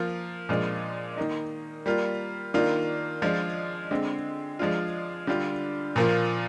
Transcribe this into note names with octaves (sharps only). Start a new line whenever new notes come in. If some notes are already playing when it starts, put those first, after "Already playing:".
Already playing: F3 A#3 F4
A#2 F3 G#3 D4
D#3 A#3 D#4
G3 A#3 F4
D#3 A#3 D4 F4
F3 G#3 D4 F4
D3 G#3 C4
F3 G#3 D4 F4
D3 G3 D4 F4
A#2 F3 A#3 F4